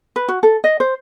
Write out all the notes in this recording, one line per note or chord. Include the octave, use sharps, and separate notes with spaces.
B4
F#4
A4
D#5
C5